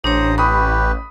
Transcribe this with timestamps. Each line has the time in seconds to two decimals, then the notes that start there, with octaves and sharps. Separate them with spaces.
0.04 A1 D4 C5 C#5 A#5 D#6
0.38 G4 B4 B5 C#6 D#6